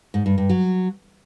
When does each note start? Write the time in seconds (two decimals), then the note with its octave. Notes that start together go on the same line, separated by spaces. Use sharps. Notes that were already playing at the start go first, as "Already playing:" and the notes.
0.14 G#2
0.26 G2
0.38 G2
0.49 F#3